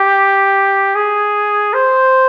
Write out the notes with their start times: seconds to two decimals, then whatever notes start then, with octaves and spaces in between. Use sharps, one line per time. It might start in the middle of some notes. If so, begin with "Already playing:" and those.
Already playing: G4
0.95 G#4
1.73 C5